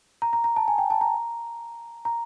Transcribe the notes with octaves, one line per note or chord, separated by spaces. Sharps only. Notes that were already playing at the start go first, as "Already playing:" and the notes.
A#5
A#5
A#5
A5
G#5
G5
A5
A#5
A#5